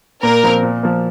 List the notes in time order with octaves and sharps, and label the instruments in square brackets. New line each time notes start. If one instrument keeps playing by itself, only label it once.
[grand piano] A#2 [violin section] A#4
[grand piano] F3 C4
A#2
F3 A#3